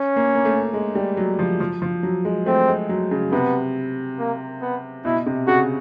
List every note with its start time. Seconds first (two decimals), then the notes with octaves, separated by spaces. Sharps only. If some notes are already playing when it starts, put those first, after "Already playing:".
Already playing: C#4
0.16 A#3
0.35 A#3
0.45 A3
0.74 G#3
0.95 G3
1.17 F#3
1.39 F3
1.60 F3
1.82 F3
2.03 F#3
2.25 G#3
2.46 A3 C4
2.68 G#3
2.89 F#3
3.11 C#3
3.32 C3 B3
4.19 A#3
4.62 B3
5.05 B2 E4
5.16 B2
5.26 C3
5.47 C#3 F#4